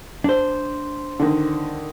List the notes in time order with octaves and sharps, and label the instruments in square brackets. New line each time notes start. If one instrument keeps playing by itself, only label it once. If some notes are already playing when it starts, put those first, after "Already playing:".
[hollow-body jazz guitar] D4 C5
[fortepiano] D3 D#3